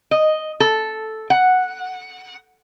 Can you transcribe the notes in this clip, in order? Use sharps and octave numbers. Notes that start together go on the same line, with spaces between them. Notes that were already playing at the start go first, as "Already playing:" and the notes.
D#5
A4
F#5